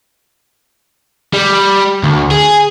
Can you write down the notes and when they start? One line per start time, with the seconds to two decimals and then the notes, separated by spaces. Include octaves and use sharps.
1.33 G3
2.03 D2
2.31 G#4